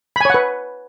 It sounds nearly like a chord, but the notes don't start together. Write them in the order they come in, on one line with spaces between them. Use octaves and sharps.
B5 G#5 C#5 F#5 B4